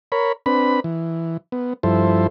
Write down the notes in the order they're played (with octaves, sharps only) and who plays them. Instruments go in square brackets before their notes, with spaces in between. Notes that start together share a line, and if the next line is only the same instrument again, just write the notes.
[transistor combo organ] A#4 C#5 B5
C4 D4 B4 B5
E3
B3
G2 F3 E4 A4 C5